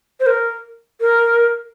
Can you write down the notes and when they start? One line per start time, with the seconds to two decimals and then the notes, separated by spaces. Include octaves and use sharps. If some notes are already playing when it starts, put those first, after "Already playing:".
0.20 C5
0.26 A#4
1.00 A#4